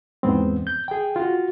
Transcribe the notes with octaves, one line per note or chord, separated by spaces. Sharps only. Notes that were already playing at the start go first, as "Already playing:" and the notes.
E2 G#2 G#3 B3 C4
G6
G#4 G5
F4 F#4